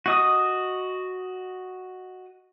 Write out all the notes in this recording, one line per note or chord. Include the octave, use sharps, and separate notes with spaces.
F#4 D#5 D#6